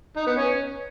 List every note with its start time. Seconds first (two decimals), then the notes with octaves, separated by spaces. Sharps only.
0.16 D#4
0.27 B3
0.37 C#4